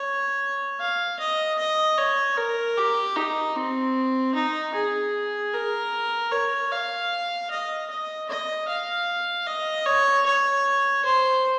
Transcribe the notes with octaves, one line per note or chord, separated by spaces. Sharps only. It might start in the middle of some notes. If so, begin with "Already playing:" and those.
Already playing: C#5
F5
D#5
D#5
C#5
A#4
G4
D#4
C4
D#4
G#4
A#4
C#5
F5
D#5
D#5
D#5
F5
D#5
C#5
C#5
C5